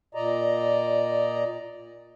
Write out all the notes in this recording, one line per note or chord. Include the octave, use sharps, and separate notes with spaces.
A#2 D5 D#5 A#5